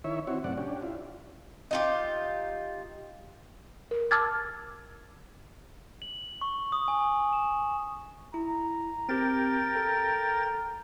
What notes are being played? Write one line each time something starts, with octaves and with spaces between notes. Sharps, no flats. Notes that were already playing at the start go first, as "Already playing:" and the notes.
D#3 E4 C#5 E5
C4 E4 F#4 C#5
F#2 A2 C3 D5 F#5
C#4 D4 G4
E4 F4
D#4 F4 G4
A#4
A5 D6 E6 F6 G#6 A6
F#7
C#6
D#6
G#5
E7
E4 A#5
C4 G4 A#4 G5 A6
A4